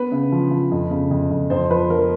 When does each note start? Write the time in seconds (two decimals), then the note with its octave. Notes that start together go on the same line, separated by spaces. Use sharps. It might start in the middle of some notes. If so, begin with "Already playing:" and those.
Already playing: B3 B4
0.12 C#3
0.32 F3
0.51 F3
0.71 F2
0.90 C#3
1.11 F2
1.31 F2
1.50 F2 C5
1.70 F3 B4
1.90 F3 A#4